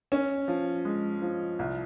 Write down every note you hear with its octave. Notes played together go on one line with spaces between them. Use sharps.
C#4
F3
G#3
F3
C2